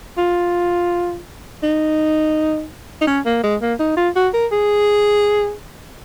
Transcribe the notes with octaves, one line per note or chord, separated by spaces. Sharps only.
F4
D#4
D#4
C#4
A#3
G#3
A#3
D#4
F4
F#4
A#4
G#4